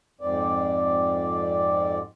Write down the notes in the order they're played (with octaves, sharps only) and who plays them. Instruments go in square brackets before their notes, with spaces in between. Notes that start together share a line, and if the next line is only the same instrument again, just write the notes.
[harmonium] F2 G#2 C4 D5